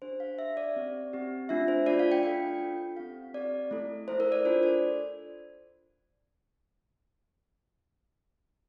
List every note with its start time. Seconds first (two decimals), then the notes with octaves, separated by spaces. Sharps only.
0.02 D4 G4 C5
0.20 F5
0.39 D4 G4 E5
0.57 D5
0.76 C4 G4
1.13 C4 G4
1.49 A3 D4 F4 E5
1.68 C5
1.86 A3 D4 F4 D5
1.99 F5
2.12 G5
2.23 D4 F4 A4 G5
2.60 D4 F4 A4
2.97 C4 G4 F5
3.34 C4 G4 D5
3.71 A3 E4 A4
4.08 A3 E4 A4 C5
4.20 A#4
4.32 D5
4.45 D4 F4 A4 C5
4.63 D5